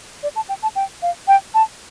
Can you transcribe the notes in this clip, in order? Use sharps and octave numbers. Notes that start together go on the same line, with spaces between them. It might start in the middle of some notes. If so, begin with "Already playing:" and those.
D5
A5
G5
A5
G5
F5
G5
A5